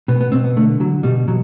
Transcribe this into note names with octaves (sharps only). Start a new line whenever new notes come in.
B2 B3
B3
B2 C4
B3
D3 A3
D3 F#3
B2 G3
B2 F#3